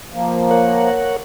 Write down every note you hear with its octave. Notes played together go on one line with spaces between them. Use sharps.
F3 A#3
A#4 C#5 F#5